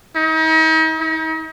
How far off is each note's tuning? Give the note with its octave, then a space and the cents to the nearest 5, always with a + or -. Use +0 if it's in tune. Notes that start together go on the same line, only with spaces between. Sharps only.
D#4 +40
D#4 +40